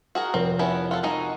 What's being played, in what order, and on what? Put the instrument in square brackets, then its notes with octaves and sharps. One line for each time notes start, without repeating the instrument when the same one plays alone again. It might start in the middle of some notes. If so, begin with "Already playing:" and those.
[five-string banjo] F#4 G#4 A#4
[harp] F1 A#4 [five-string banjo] C4
[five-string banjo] B3 C#4 E4
[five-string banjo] F4 A4 [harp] F#5
[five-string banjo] G#3 D#4 F#4 [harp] D#5 A#5